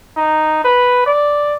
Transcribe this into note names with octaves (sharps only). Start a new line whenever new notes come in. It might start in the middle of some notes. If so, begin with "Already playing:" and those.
D#4
B4
D5